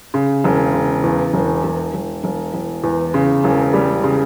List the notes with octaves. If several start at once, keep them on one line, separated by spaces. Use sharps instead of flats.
C#3
E1
C#3
E2
E1
E1
E1
E1
E1
E2
C#3
E1
G3
C#3